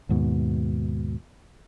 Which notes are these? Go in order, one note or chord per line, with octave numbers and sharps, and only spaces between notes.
D#2 G#2 B2